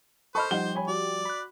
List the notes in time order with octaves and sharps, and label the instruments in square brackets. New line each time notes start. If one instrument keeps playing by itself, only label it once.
[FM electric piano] A4 B5 F6 [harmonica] C5 [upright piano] D#5 A5 C#6
[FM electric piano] F3 G3 G4 [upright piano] D#4 F#5 G7
[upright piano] C#5 G#5 B5
[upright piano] F#4 [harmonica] D5
[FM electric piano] B5 F#6